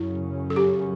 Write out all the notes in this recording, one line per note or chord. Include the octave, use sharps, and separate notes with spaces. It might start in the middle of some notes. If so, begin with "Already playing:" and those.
Already playing: F#2 C#3 F#3 C#4 E4
A4
G4